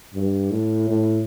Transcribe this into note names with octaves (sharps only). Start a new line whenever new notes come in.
G2
A2
A2